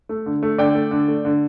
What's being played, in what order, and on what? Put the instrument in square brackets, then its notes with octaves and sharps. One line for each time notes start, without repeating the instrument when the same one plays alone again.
[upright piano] A3
D3
A3
D3 D5 G5
A3
D3
A3
D3